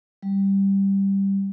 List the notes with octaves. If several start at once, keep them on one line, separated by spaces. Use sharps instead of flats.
G3